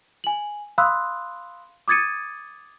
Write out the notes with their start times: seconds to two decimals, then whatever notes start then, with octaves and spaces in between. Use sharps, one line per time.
0.24 G#5 F#7
0.78 F5 B5 C6 D#6 E6 F#6
1.88 D6 D#6 G#6 A6 C#7 D#7